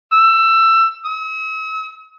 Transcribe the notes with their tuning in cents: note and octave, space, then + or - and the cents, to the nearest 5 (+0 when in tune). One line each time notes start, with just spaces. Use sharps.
E6 +20
E6 -45